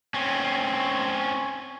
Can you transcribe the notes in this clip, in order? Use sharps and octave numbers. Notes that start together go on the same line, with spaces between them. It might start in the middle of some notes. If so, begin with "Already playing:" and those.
C4 C#4